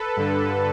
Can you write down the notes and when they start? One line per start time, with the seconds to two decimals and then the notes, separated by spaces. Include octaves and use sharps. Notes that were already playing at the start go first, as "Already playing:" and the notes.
Already playing: A4 B4
0.17 G2 D3